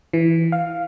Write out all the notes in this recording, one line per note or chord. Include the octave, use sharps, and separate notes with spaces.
E3
F5